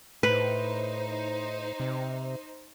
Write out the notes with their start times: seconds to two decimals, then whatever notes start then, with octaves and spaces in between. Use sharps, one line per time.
0.23 A2 D#4 B4 C5
1.80 C3